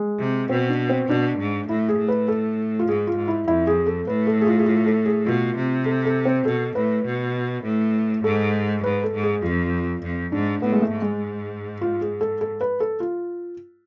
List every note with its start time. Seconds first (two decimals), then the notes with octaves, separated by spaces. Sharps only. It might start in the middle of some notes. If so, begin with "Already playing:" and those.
Already playing: G#3
0.19 C3
0.49 B2 C4
0.69 D4
0.89 C4
1.08 B2 D4
1.38 G#2
1.68 A2 E4
1.89 G#4
1.98 A2
2.08 B4
2.28 A4
2.79 F4
2.88 G#2 G#4
3.07 F4
3.17 G#2
3.28 E4
3.47 F2 E4
3.67 G#4
3.86 A4
4.07 A2 B4
4.27 A4
4.41 G#4
4.47 F4
4.59 G#4
4.66 F4
4.86 A4
5.06 G#4
5.26 B2 F4
5.56 C3
5.86 A4
6.05 A4
6.25 C4
6.45 B2 A4
6.75 A2 B4
7.05 B2
7.64 A2
8.24 G#2 A4
8.84 G#2 B4
9.04 A4
9.14 G#2
9.23 G#4
9.42 F2 F4
10.02 F2
10.32 G#2 D4
10.62 A2 B3
10.72 G#3
10.82 A3
10.92 G#2
11.02 G#3
11.81 F4
12.01 G#4
12.21 A4
12.41 A4
12.61 B4
12.80 A4
13.00 F4